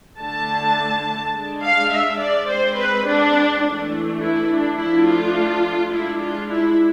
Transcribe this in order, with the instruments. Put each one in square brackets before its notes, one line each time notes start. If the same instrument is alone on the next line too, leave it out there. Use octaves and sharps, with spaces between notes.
[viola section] D3 A3 D4 A5
G#3 D4
F5
E5
D5
G#3 C4 C5
B4
D4
E3 A3 D4
E4
D4
F3 A3 D4 E4
F4
G#3 D4 E4
F4
E4